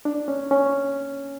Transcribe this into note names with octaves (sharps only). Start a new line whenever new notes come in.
D4
C#4
C#4